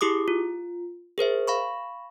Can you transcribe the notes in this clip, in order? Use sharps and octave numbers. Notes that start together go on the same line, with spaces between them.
E4 G4 G#4 D6 D#6
F4
G#4 A#4 C5 E5
F5 B5 C#6